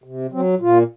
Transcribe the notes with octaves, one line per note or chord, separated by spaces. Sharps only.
C3
F#3 C4
A#2 F4